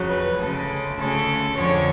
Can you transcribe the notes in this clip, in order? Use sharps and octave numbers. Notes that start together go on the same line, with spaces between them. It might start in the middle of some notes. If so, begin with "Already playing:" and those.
Already playing: F2 C#3 F#3
B4
D2 C#3 G#3 A4
D2 C#3 G#3 A4
F2 D3 G#3 C#5